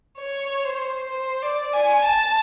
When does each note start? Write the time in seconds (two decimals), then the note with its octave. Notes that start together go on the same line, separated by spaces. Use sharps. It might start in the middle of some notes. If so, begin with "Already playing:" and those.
0.18 C#5
0.66 C5
1.11 C5
1.42 D5
1.73 G#5
2.05 A5